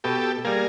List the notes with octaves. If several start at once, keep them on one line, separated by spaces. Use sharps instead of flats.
B2 G4 A4
G3 A#3 G#4 A#4